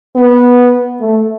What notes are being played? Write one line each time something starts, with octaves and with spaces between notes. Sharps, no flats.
B3
A3